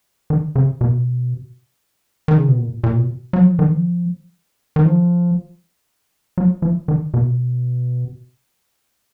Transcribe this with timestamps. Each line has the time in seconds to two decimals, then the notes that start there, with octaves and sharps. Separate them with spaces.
0.30 D#3
0.56 C#3
0.81 B2
2.28 D#3
2.38 C#3
2.48 B2
2.58 A#2
2.84 A#2
2.96 B2
3.33 F#3
3.46 F3
3.59 D#3
3.71 F3
4.76 D#3
4.86 F3
6.38 F#3
6.62 F3
6.88 D#3
7.14 B2